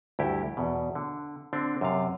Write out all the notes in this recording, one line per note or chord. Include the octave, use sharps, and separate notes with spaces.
D2 G2 E4 G4
E2 B2
D3
D3 C4 D4
F#2 C3 F5